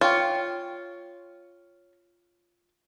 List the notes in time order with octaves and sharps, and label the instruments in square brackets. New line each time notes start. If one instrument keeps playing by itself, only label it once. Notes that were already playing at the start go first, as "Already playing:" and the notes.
[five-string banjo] F4 [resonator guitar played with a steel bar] C#5 G5